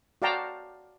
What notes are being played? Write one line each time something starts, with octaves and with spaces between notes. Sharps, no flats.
F#4 D5 F5 G5 A5 A#5